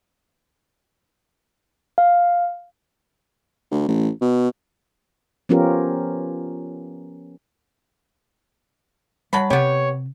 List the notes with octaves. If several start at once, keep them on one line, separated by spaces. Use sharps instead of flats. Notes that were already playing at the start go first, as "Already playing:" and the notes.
F5
D2
A1
B2
F3 B3 C#4 F4 G4 A#4
F#3 G3 A5 B5
C3 B3 G4 C#5